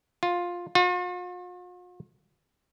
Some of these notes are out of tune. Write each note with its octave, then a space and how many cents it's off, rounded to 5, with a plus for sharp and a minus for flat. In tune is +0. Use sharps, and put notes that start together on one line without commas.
F4 +10
F4 +45